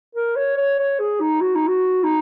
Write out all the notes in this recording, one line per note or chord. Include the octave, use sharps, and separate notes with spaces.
A#4
C#5
C#5
C#5
G#4
D#4
F#4
D#4
F#4
D#4